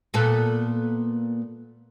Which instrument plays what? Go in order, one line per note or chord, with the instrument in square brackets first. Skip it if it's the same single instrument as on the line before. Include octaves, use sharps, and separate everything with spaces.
[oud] A#2 B3 A4